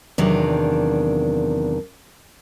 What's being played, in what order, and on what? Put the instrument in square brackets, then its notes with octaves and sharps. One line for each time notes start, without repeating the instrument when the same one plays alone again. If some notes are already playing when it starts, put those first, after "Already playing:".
[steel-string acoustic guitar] E2 C3 D#3 F#3 D4 F4